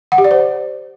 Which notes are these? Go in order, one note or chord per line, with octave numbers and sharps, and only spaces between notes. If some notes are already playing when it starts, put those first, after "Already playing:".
F#5
G4
D5
C5